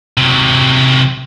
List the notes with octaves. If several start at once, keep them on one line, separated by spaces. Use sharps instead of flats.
C3 F#3